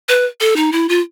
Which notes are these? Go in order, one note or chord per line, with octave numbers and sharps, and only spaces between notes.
B4
A4
D#4
E4
F4